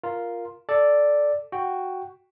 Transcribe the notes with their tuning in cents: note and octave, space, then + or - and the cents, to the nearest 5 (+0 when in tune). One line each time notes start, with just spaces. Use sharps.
F4 +0 A#4 +0
A4 +0 D5 +0
F#4 +0 G5 +0